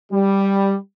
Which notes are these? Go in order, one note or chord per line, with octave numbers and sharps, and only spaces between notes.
G3